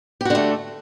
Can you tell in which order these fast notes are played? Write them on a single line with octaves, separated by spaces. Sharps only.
G4 F#4 D3 A3